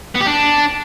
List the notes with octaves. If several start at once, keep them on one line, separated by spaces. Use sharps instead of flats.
B3
G4
D4